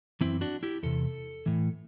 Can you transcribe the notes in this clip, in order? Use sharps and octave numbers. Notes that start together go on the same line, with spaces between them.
F#2 E3 C4 E4
D4 F#4
E4 G4
E2 C3 A4
A2 E3